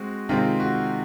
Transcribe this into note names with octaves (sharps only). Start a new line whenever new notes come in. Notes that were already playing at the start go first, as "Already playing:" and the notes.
Already playing: G#3 C4 F#4
C3 D#3 G#3 C4 F4
F#4